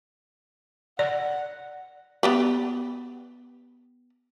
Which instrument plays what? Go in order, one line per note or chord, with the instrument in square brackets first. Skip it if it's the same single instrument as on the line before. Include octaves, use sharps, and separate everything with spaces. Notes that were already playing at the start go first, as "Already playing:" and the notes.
[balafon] D5 [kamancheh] F#5
[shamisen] B3 G4 B4